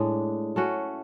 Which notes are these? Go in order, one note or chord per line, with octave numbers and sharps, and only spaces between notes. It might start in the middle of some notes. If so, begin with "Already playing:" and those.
Already playing: A2 G#3 D4
A3 C#4 F#4